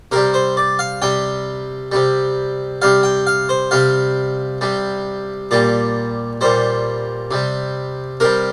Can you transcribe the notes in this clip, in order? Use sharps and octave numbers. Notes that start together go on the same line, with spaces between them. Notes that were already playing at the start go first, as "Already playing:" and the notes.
C3 G3 A#4
C5
D5
F5
C3 G3 G5
C3 G3
C3 G3 F5
G5
F5
C5
C3 G3 F5
C3 G3
A#2 G3 D5
A#2 G3 C5
C3 G3
C3 G3 A#4